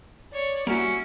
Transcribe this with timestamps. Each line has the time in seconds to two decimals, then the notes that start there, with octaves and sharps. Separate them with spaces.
0.32 C#5 D5
0.67 G3 A#3 C#4 E4 F#4